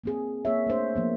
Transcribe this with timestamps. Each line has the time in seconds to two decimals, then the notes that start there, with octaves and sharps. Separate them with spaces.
0.04 A#3 C4 G#4
0.45 A#3 G#4 C#5 E5
0.66 A3 D4 C5
0.96 F3 A#3 B3